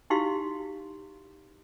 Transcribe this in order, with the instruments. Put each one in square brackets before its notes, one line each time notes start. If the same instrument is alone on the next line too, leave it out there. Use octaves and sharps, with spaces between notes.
[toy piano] D#4 E4 F#4 G4 F5 C6